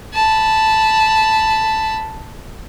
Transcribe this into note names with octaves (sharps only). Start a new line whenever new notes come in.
A5 B5